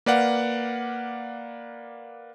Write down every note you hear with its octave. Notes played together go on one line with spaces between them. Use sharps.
A#3 B4 D5 F5 F#5